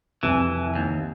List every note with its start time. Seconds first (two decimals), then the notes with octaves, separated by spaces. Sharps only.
0.23 C2 F2 E3 G#5
0.75 D#2